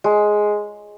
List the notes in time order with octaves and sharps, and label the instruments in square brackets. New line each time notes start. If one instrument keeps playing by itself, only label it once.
[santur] G#3